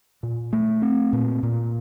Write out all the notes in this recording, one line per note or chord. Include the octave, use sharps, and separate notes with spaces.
A#2
A3
C4
A#2
A#2